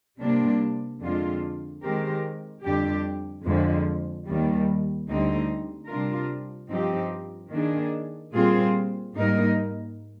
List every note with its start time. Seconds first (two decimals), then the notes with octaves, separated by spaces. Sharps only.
0.19 C3 G3 A#3 D4
1.02 F2 D3 G#3 D4 F4
1.83 D#3 G#3 C4 G4 A#4
2.63 F2 D3 G3 D4 G4
3.44 F2 D3 F3 G#3
4.26 D#2 D#3 G3
5.08 D2 D3 G3 C4 D#4
5.89 C3 G3 D4 F4 A#4
6.70 G2 F3 C4 D#4 G4
7.51 D#3 A#3 D4 G#4
8.33 A#2 G3 C4 F4 G#4
9.13 G#2 G3 A#3 D#4 A#4